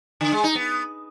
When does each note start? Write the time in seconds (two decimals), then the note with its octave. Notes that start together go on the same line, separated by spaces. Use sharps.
0.21 D3
0.32 G#3
0.44 D#4
0.55 B3